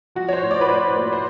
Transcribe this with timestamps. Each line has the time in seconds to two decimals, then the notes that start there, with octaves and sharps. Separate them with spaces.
0.15 F3 F#4
0.28 C#5
0.33 C5
0.43 A2
0.51 D5
0.61 B4
0.69 A2 C5
0.95 A#3
1.13 C5